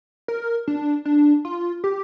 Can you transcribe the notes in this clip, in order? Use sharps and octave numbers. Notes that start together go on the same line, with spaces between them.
A#4
D4
D4
F4
G4